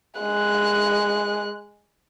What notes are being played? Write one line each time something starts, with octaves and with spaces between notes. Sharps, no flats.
G#3 F#6